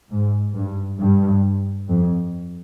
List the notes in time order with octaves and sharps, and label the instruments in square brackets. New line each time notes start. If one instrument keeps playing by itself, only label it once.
[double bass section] G#2
G2
G2
F2